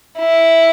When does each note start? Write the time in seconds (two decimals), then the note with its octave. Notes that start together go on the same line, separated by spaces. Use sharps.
0.19 E4